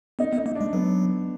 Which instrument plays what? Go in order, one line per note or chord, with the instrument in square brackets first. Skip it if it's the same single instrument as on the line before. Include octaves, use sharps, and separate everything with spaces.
[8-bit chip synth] B3 [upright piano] D#4
[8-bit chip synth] B3
[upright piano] D#4
[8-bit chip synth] A#3
[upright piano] D4
[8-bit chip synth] G#3
[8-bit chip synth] F#3 [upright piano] B3